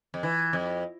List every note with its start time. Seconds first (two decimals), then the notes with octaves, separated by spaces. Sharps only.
0.14 F2
0.23 E3
0.53 F2